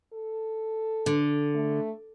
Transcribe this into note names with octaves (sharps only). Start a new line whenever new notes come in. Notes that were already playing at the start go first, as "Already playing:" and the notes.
A4
D3
A3